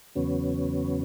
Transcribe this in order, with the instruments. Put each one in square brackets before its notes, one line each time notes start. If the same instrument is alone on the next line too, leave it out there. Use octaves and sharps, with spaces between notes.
[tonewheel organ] E2 C#3 F#3 B3 C#4